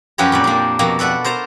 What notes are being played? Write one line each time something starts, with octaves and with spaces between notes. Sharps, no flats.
F#2 F3 G4 B4 C#5 A#5
F2 A#2 D5
A#3 D4
F2 B2 A#3 A#5
A4 B4 D5 E5 F#5
A#4 C5 A5 A#5